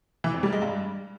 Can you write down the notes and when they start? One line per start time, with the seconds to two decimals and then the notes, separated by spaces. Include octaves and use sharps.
0.24 E3
0.34 F2
0.43 G3
0.53 G#3
0.62 G2